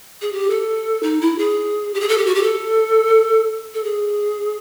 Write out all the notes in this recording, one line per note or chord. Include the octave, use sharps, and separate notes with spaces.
G#4
G4
A4
D#4
E4
G#4
G4
G#4
A4
G4
F#4
G4
A4
A4
G#4